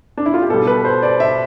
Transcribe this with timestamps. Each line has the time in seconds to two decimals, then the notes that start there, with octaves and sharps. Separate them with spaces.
0.18 D4
0.26 E4
0.34 F4
0.42 G4
0.50 B2 G3 A4
0.67 B4
0.85 C5
1.03 D5
1.20 E5